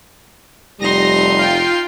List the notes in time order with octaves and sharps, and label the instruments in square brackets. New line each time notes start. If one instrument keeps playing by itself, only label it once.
[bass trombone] F1 [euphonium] G3 [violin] D#4 C6 [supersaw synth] A#6
[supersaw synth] F4 G5